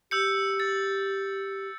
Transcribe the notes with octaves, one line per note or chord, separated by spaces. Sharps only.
G4 E6 G6 C#7
A6